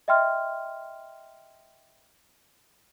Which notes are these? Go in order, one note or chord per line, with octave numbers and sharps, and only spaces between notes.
D#5 E5 G5 C6 F6